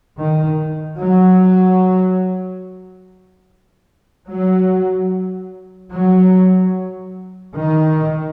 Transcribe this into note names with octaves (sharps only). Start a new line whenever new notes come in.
D#3
F#3
F#3
F#3
D#3